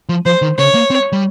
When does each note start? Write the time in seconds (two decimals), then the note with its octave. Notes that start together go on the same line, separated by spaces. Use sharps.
0.09 F3
0.26 F3 C5
0.42 D#3
0.58 C#3 C#5
0.74 A#3
0.90 C4
1.12 G3